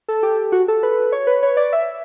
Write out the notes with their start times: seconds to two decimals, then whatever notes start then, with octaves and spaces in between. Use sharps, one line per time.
0.08 A4
0.23 G4
0.52 F#4
0.68 A4
0.83 B4
1.12 C#5
1.27 B4
1.43 C#5
1.57 D5
1.73 E5